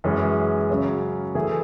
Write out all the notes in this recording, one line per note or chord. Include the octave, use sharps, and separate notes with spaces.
F#2 E3 G#3 C#4 G#4
C#3 F#3 C#4
E3 A3 E4 G#4